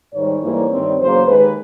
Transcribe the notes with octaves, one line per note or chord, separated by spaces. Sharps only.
G#2 D#3 G3 C#5
G#2 E3 G3 A#3
G2 D#3 G3 C4
E2 C#3 F#3 A#3 C5
D#2 D#3 G#3 B4